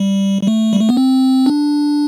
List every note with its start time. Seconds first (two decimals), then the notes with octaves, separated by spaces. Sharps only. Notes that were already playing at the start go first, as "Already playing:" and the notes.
Already playing: G3
0.43 G3
0.47 A3
0.73 G3
0.81 A3
0.89 B3
0.97 C4
1.46 D4